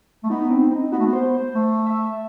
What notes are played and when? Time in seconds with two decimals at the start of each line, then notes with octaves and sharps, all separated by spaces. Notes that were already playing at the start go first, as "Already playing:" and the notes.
0.23 A3
0.30 B3 D#4
0.50 C4
0.72 D#4
0.92 B3 F#4
0.99 A3
1.06 B3
1.13 C5
1.34 C5
1.54 A3
1.86 E5